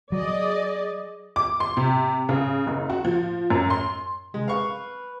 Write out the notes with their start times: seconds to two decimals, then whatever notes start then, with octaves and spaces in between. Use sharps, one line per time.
0.12 F#3 G#4 D5 D#5
1.36 D6
1.60 C6
1.77 C3
2.29 C#3
2.67 F#1
2.90 F#4
3.05 F3
3.50 F#2
3.70 C6
4.34 C3 G#3
4.48 B4 F5 C#6